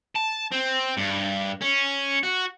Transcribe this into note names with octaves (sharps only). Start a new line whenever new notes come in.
A5
C4
G2
C#4
F#4